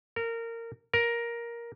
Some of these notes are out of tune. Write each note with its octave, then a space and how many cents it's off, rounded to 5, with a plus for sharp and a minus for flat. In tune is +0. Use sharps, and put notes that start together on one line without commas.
A#4 -20
A#4 +10